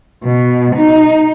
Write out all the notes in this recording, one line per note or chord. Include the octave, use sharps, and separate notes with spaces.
B2
D#4